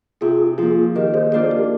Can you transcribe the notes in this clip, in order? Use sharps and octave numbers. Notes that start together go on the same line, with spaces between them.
C3 F4 G#4
F3 A#3 F4 G#4
D#3 G4 A#4
G#4 C5
A#3 D4 F4 G#4 C5
G4 A#4